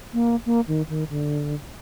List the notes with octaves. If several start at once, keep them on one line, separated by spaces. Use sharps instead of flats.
A#3
A#3
D#3
D#3
D3